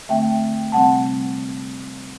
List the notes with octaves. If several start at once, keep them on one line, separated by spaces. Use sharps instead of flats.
D3 A3 C4 E5 G5
C3 G3 C4 F#5 A5